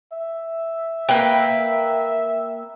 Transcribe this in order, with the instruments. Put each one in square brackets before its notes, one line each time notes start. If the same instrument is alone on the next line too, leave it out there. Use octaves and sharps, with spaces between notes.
[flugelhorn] E5
[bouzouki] A#3 B4 G5